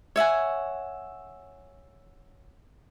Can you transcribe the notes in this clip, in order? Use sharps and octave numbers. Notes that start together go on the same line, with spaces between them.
C#5 E5 F#5 G#5